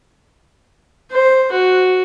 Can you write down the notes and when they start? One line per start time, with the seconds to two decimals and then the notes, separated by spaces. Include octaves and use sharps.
1.12 C5
1.51 F#4